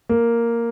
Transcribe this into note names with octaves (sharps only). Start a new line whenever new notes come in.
A#3